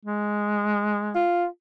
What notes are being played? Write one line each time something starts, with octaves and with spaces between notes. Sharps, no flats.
G#3
F4